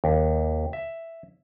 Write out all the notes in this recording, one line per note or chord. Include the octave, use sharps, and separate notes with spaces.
D#2
E5